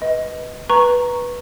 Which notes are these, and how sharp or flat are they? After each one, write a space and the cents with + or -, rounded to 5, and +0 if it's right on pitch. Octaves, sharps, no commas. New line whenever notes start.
B4 +0 D#5 +15
B4 -15 A#5 +0 C#6 -10